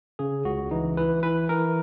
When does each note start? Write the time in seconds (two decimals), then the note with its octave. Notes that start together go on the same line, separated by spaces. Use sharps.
0.19 C#3 G#4
0.45 C#2 F#4
0.71 E3 D#4
0.97 E3 B4
1.23 E3 B4
1.49 E3 A#4